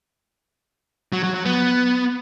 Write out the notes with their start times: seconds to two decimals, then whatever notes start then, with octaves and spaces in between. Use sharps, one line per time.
1.13 F#3
1.23 F#3
1.34 F#3
1.45 B3